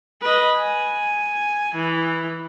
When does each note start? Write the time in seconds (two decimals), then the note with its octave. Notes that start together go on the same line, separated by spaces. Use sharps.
0.21 B4 D#5
0.57 G#5
1.74 E3